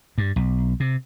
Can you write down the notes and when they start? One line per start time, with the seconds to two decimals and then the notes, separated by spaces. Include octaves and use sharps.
0.18 G2
0.36 B1
0.80 C3